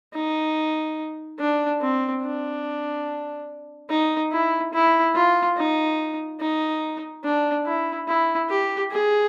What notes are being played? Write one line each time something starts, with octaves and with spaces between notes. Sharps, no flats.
D#4
D4
C4
D4
D#4
E4
E4
F4
D#4
D#4
D4
E4
E4
G4
G#4